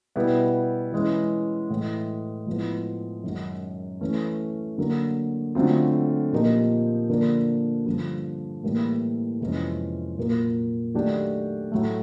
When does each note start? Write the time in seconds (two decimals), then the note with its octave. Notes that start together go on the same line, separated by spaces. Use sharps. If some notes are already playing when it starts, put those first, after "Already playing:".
0.16 B2 G3 B3 E4 G4
0.92 E3 G#3 C#4 E4
1.70 A2 E3 G#3
2.47 A2 F3 G#3 B3 E4
3.24 F#2 D#3 G#3 C#4 F#4
4.01 E3 A3 C#4
4.78 D3 F#3 A#3
5.55 D3 F#3 A3 C4 F4
6.33 A#2 F3 A#3 D#4 G4
7.09 D3 F3 A#3 D4
7.86 G2 D3 F3
8.63 A2 E3 G3 A#3
9.40 F2 C3 E3 G#3 C#4
10.18 A#2 F#3 A#3
10.94 D#3 F#3 A3 D4 G4
11.72 A2 F#3 A3